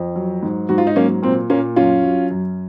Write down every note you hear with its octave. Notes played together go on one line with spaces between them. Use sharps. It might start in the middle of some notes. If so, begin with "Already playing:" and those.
Already playing: F2
F#3
G#2
G#2 F#4
F4
D#4
F#3 A#3 C#4
A#2 C4
A#2 A#3 C#4
F#2 C#4 F4
F#3
F#2